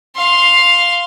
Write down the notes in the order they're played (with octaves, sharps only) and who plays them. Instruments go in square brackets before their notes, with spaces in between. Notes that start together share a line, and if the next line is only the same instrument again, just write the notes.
[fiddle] F5 C6